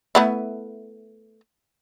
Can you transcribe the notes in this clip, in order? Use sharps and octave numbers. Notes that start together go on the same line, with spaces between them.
A3 B3 E4